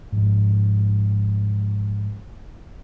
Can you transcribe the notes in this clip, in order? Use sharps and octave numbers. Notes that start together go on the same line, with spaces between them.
G#2 F3